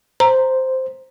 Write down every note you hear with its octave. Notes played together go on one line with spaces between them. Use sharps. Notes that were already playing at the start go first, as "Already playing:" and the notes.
C5 A#5